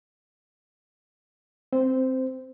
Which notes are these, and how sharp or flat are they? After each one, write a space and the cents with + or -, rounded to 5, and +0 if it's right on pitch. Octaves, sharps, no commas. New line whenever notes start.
C4 +0 C5 -15